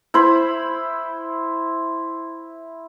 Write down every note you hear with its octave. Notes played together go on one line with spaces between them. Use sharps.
E4 C5 B5